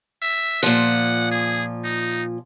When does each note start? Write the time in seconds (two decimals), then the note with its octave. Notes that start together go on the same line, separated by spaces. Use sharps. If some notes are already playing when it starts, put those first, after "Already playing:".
0.22 E5
0.63 A#2 F3 F#5
1.31 G#4
1.84 D#4